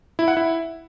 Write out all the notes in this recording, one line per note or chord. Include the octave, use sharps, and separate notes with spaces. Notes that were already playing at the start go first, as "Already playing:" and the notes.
E4
F#5
E4